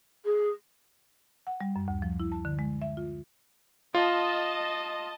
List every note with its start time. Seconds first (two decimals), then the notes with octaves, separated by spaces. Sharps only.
0.25 G#4
1.47 F#5
1.61 G3
1.76 F#2
1.88 D2
2.02 F3
2.20 E4
2.32 A5
2.45 D3
2.59 G#3
2.81 E5
2.97 F4
3.95 F4 D#5 A5